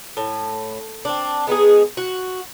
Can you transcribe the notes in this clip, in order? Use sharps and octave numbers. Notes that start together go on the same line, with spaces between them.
A2
C4 D4
G#3 B3 D#4 G#4
F#4